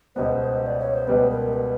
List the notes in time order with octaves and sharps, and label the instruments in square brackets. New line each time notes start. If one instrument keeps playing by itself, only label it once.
[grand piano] C#2 B2 G3 B3 [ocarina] C5
[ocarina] D5
C#5
C5
[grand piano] C#2 B2 G3 B3 [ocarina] B4
[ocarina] A#4
B4